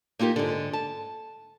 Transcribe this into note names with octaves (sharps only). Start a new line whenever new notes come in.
A#3 D#4 F4 G4 A#4
G#2 D3
A5